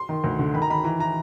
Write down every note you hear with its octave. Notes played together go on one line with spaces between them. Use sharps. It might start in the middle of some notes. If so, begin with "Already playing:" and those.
Already playing: C6
D#3
D2
D3
D#3 B5
A#5
D#3 B5
E3 A#5
E3 A#5